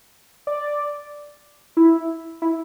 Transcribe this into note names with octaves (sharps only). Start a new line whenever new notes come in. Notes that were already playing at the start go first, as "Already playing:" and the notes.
D5
E4
E4